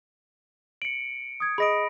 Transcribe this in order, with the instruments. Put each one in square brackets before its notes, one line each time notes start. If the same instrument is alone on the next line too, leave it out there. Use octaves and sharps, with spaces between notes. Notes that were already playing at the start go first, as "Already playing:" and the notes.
[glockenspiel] C#7 D7 [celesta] F#7
[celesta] D#6 G#6
[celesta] G#4 D#5 D#6 [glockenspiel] B5 A#6 D7